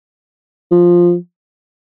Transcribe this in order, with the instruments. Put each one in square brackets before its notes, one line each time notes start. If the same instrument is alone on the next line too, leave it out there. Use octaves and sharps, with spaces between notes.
[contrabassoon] F3